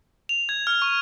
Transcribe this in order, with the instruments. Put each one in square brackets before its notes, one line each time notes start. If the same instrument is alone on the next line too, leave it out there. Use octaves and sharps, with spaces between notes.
[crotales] F7
G#6
F6
C#6